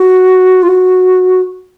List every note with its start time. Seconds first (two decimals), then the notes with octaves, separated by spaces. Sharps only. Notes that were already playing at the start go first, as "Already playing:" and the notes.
Already playing: F#4
0.63 F4
0.68 F#4